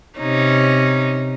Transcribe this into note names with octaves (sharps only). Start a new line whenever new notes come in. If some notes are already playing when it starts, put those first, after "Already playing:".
C3 C#4 D#4